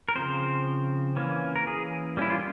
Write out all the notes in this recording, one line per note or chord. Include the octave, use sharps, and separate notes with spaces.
A#4
C#3 F3 C4 C5
E3 A#3 C#4
A#4
G#4
G3 A#3 C#4 E4
F4